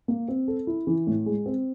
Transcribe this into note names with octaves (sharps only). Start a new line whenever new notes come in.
A#3
C4
A4
E4
E3
A2
G#3
C4